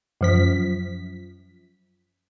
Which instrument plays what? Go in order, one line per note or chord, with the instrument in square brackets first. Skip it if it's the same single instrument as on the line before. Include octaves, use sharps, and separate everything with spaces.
[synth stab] F#2 F3 B6